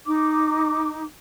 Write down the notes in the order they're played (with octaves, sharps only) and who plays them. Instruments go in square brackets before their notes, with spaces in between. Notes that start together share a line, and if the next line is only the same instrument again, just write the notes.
[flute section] D#4 D6